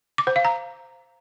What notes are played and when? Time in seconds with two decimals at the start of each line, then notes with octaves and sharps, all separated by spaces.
0.18 D6
0.27 C5
0.36 F5
0.45 A#5